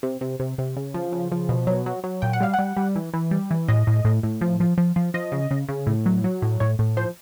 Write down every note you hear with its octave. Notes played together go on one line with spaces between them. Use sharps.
C3
C3
C3
C3
C#3
F3
C#3
F3
B2
F#3
F#3
F#3
A#2 G5
F#5
G3 F5
F#5
G3
G3
E3
E3
G3
E3
A2 D#5
A2
A2
A2
F3
F3
F3
F3
F3 D#5
C#3
C#3
C#3
A2
F#3
F#3
A2
A2 C#5
A2
F3 C5